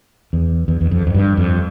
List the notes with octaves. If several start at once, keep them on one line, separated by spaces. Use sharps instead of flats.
E2
E2
E2
F2
F2
G2
F2